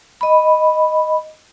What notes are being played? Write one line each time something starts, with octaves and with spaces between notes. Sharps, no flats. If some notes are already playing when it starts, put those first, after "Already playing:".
D#5 B5